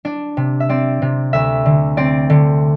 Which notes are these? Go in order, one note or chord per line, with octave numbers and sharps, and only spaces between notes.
D4
C3
E5
C4 D5
C3
D2 E5
D3
C4 D5
D3